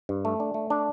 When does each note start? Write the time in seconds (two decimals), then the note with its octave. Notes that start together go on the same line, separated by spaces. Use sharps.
0.09 G2
0.25 A3
0.40 D4
0.54 A3
0.70 D4